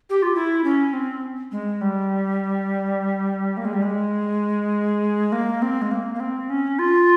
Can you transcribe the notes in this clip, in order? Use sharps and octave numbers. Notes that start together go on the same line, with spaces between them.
G4
F4
E4
C#4
C4
G#3
G3
A#3
G#3
G3
G#3
A#3
C4
G#3
A#3
A#3
C4
C#4
F4